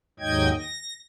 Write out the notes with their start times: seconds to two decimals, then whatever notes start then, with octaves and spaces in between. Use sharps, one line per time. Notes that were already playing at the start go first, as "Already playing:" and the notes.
0.20 D#2 G#2 F#3 D#5 G5 G#6
0.58 A#6